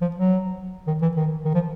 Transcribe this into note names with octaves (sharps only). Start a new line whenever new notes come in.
F3
F#3
D#3
E3
D#3
D#3
F3